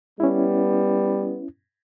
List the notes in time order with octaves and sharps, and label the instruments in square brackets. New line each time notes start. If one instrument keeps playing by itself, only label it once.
[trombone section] G3 B3 [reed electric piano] C#4 E4